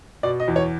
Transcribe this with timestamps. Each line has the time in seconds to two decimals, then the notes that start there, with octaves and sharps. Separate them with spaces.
0.23 B2 D5
0.40 D#5
0.48 E2
0.56 C#5